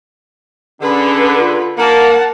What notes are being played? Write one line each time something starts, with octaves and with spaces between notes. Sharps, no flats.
D3 C#4 G#4 B4
F4
A#3 A#4 F#5 A5